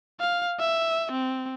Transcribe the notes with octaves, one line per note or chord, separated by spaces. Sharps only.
F5
E5
C4